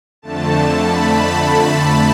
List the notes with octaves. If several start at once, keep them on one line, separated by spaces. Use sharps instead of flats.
F2 D3 A3 A5
B5